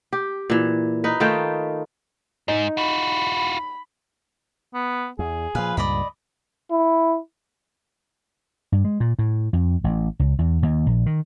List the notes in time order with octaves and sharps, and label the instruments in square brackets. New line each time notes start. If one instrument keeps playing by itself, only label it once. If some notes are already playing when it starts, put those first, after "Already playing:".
[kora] G4
A#2 E3
D#4 B4
D#3 A3 F4 G5
[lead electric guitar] G#2 [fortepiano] D#4
[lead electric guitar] F4 F#4 [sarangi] B5
[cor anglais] B3
[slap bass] E2 [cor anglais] G#4
[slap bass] A#2 F3 [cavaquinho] B4 F5
[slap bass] C#2 G2 A#2 [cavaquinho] D5 D#5 B5
[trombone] E4
[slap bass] G2
G#3
A#2
A2
F2
A1
C#2
E2
D#2
A#1
D#3